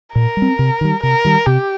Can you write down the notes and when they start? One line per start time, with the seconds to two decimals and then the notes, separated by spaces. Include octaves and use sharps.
0.15 A#2 A#4
0.37 G3
0.42 C4
0.59 C3
0.81 D#3 G3
1.03 C3 A#4
1.25 D#3 G3
1.46 C3 G4